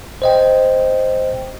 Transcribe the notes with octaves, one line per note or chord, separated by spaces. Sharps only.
C5 D#5 G5